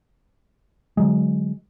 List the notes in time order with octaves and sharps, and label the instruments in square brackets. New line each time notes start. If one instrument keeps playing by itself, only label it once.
[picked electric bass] D3 F#3 G#3